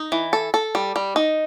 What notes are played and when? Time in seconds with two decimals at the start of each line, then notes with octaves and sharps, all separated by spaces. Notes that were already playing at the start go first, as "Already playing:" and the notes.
Already playing: D#4
0.12 E3
0.33 A4
0.54 A4
0.75 G3
0.96 G3
1.16 D#4